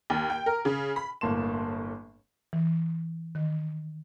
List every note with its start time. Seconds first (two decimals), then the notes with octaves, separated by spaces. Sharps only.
0.10 D#2
0.30 G5
0.46 A#4
0.65 C#3
0.96 B5
1.21 G1 A2 A#3 A5 C6 E7
2.53 E3
3.35 D#3